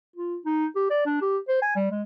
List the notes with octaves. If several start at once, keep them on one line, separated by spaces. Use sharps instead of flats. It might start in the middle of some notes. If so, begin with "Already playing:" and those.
F4
D#4
G4
D5
D4
G4
C5
G#5
G3
G#3